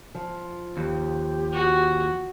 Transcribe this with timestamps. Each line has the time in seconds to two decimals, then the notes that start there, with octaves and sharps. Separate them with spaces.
0.15 F3
0.77 D#2 G4
1.53 F#4